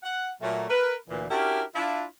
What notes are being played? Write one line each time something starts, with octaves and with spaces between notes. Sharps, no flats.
F#5
A#2 F#3 A3
A#4 B4
D2 A#2 E3
C#4 D4 E4 F#4 G4 A#4
D4 E4 F4